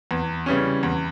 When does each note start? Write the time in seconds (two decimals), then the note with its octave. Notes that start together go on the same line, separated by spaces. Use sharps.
0.11 E2
0.46 C#3 E3 G3 C#4
0.83 E2